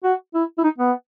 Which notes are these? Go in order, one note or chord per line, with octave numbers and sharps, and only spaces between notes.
F#4
E4
E4
D#4
B3